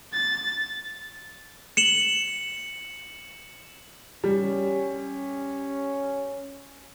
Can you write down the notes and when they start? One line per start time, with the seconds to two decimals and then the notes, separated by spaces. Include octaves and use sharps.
0.13 A6
1.77 C#7 E7 F#7
4.24 G3 C#4